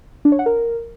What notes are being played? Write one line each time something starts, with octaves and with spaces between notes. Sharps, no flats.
D4
C#5
F#5
A#4